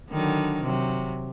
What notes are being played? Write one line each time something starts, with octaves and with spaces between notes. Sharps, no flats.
D3 D#3 F#3
C3 F#3